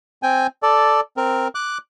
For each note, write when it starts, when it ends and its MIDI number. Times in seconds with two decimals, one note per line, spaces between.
0.23 0.47 60
0.23 0.47 79
0.23 0.47 80
0.63 1.00 69
0.63 1.00 74
1.17 1.48 60
1.17 1.48 70
1.55 1.78 86
1.55 1.78 90